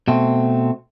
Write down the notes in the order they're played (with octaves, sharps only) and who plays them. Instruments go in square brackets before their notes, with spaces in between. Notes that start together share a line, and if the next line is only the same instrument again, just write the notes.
[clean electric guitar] B2 A3 C4